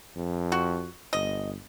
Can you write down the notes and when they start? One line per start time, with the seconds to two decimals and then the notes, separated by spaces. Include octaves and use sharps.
0.16 F2
0.52 F#4
1.13 G1 D#5